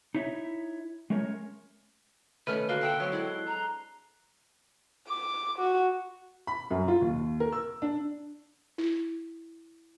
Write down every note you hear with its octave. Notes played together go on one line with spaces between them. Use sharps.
D#4 E4 C#5 E5
G#3 A3 C#4 A#4 C#5
D#3 A3 C#4 B4 F6
D3 A#3 F#4 F#6 C7 G7
D4 E5 F#5 G5
F#3 B3 C4 C#5
G#3 E4 A4
A#5
D6
F#4
B5
F#2
F4
D#2
A#4
E6
D4
E4